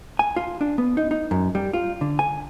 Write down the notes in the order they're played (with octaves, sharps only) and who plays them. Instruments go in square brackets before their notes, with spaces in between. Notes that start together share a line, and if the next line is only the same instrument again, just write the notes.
[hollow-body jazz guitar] G#5
F4
D4
B3
D#4
D#4
F#2
G3
F4
D3
G#5